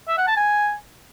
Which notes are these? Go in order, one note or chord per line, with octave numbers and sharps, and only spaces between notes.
E5
F#5
A5
G#5